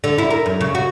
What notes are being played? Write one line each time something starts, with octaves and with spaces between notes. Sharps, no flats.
D3
E4
A#4
F#2
C#3
F#4